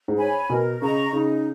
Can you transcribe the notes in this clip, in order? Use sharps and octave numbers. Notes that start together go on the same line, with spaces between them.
G#2
C#5 G#5 B5
B2 A#4
C#3 D#5 A#5 C#6
C#3 D#4